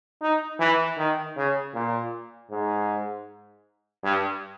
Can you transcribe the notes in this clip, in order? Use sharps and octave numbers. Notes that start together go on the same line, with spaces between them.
D#4
E3
D#3
C#3
A#2
G#2
G2